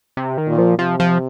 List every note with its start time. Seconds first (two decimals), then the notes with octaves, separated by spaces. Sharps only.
0.17 C3
0.38 D#3
0.47 A#2
0.58 F3
0.78 C3 F3
1.00 F3